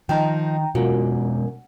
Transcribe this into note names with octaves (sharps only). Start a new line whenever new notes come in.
D#3 F3 D#4 G5 A#5
F#2 B2 G#3 F4 F#4 A#4